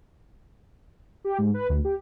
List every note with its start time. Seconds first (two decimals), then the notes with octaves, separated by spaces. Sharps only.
1.24 G4
1.38 G#2
1.54 B4
1.69 D2
1.85 G4